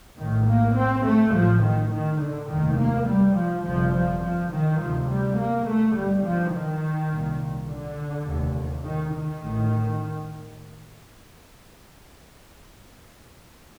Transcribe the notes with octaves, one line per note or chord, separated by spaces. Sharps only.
A#1 A2 D#3
A#3
C4
A3
A1 A2 F3
D#3
D#3
D3
F1 D#2 D#3
A#3
G3
F3
G1 F2 C3 F3
F3
F3
D#3
D2 C3 F3
G3
A#3
A3
G1 G2 G3
F3
D#3
C2 A#2
D3
F1 D#2
D#3
D#3
A1 A2